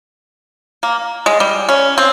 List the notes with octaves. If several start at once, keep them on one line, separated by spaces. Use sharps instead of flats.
A#3
G#3
G3
C#4
C4